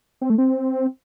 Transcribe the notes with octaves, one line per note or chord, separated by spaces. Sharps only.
C4
A3
C4